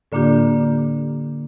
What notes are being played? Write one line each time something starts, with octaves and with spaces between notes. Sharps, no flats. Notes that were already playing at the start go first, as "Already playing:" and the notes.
A2 D3 A#3 D4 F4 G4